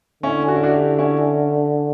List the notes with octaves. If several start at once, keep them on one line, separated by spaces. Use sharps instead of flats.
D3 C#4 E4
F#4
E4
D4 F#4
E4 G4
C#4 E4